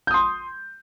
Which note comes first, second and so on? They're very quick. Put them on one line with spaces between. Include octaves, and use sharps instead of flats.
G6 D#6 C6